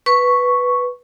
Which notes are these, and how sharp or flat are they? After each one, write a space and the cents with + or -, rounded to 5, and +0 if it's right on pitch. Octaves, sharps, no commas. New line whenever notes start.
B4 +0 C#6 +0